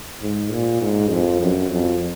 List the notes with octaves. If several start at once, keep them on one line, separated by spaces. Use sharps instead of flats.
G#2
A#2
G#2
F2
F#2
F2